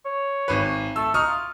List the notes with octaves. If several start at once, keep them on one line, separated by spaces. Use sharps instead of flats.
C#5
G#1 B4
A3 E6
D#4 C#6 D#6 F6
F4